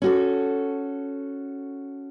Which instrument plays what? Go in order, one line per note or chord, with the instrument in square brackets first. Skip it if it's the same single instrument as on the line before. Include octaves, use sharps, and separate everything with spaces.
[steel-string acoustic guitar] C#4 F#4 A4